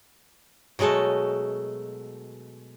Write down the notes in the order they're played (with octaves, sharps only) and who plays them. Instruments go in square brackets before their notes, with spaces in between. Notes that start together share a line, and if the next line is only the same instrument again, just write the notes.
[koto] B2 F#3 G#3 A3 A4